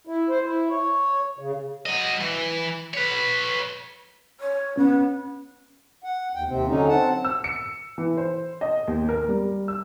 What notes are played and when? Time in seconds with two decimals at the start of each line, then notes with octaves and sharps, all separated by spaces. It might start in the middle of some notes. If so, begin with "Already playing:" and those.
0.07 E4
0.29 C5
0.44 E4
0.70 C#5
1.39 C#3
1.86 F#3 D#5
2.21 E3
2.94 B4 C#5
4.40 C#5
4.77 B3 C#4
6.04 F#5
6.35 D#2 G5
6.49 D#2 C3 C4
6.67 D3 F#3 C#4 D#4
6.88 C4 F#5 A5
7.25 E6
7.44 C#7
7.98 E3
8.17 C5
8.61 D#5
8.88 D#2
9.09 A#4
9.29 G3
9.68 E6